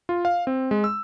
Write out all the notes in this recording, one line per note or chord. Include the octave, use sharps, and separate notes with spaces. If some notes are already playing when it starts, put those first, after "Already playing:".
F4
F5
C4
G#3
E6